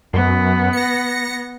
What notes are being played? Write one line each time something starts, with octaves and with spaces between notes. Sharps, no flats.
F#2 B3
A#6 C#7